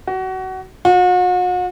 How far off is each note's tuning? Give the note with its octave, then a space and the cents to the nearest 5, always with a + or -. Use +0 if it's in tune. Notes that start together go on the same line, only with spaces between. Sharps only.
F#4 +25
F#4 -40